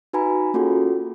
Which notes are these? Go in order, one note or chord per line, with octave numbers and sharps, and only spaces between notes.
D#4 F#4 B4 G#5 A#5 B5
A#3 C#4 F4 F#4 G#4 A4